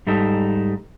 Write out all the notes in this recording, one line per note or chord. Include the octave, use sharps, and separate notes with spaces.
G#2 G3 D#4 A4